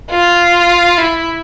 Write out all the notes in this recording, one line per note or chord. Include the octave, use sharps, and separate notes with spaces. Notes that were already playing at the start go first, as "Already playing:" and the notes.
F4
E4